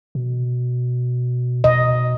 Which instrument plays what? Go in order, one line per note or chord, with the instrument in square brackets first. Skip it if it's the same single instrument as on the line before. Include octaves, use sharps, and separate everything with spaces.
[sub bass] B2
[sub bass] B2 [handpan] D#5